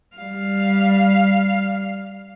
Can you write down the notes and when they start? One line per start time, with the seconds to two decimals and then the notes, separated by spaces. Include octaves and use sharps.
0.16 G3 F5